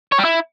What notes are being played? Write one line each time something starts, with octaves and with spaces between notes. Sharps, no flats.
C#5
G3
E4